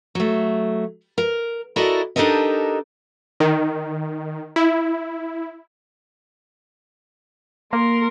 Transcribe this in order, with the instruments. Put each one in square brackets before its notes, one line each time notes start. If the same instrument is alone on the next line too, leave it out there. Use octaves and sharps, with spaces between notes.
[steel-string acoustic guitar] F#3 A3
A#4
E4 F#4 A4 A#4 D5 D#5
D4 D#4 G4 A4 A#4 D#5
[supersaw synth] D#3
E4
[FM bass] A#3 [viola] A#4 C6